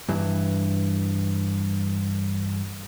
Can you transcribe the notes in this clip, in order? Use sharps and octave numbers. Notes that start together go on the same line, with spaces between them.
G2 E3